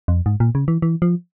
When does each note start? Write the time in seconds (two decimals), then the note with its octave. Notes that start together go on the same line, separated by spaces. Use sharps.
0.08 F2
0.26 G#2
0.40 A#2
0.55 C#3
0.68 E3
0.82 E3
1.02 F3